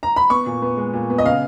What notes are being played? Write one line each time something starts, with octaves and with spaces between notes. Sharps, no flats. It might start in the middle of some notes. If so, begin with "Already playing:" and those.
A#5
B5
B3 C#6
A#2
B3
G#3
A#2
B3
D#5
C#3 F5